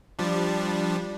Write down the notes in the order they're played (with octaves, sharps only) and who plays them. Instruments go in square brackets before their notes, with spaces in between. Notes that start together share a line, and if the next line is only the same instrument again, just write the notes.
[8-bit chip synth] F3 G3 D4